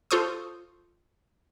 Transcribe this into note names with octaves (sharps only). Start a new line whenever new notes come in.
F4 A4 C5 C#6 D#6